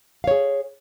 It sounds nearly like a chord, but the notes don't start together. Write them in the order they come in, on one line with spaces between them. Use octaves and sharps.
F5 C#5 G#4